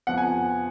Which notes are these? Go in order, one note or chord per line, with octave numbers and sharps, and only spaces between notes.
F2 F3 B3 F#5
G#5